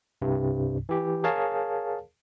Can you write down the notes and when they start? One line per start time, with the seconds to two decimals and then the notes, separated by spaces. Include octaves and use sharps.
0.22 C2 G2 C3
0.89 E3 G4
1.24 G#4 A#4 C#5 F5 A5